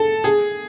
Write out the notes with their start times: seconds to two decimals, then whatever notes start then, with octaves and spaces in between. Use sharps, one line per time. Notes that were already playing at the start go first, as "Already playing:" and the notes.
Already playing: A4
0.24 G#4